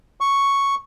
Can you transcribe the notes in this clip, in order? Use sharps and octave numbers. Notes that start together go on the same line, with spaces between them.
C#6